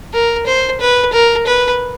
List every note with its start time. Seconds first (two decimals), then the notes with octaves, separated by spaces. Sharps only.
0.13 A#4
0.47 C5
0.81 B4
1.13 A#4
1.47 B4